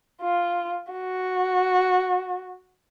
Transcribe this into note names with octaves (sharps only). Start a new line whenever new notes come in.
F4
F#4